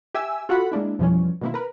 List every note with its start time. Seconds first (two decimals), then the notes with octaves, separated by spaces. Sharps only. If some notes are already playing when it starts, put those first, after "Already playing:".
0.14 G4 E5 G#5 E6
0.49 F4 F#4 A4 F#5 B5
0.72 G#3 A#3 D4 E4
0.99 F2 B2 E3 F3 G3 C#4
1.41 B2 D#3 A#3 C4 E4
1.54 A#4 B4